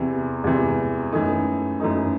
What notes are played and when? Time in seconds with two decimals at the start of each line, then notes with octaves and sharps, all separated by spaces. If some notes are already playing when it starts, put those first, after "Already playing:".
Already playing: E2 C3 E3
0.44 E2 C3 E3
1.12 F#2 E3 A3 D#4
1.80 F#2 E3 A3 D#4